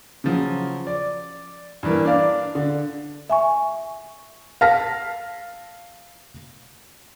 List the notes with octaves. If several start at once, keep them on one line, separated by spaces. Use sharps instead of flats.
C#3 F3 F#3
D5
G2 E3 A#3
D4 D5 F5
D3
E5 G#5 C#6
F5 A5 F6 A#6 B6